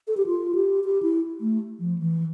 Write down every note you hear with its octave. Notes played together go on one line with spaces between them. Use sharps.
A4
G4
F4
G4
G4
E4
A3
F3
E3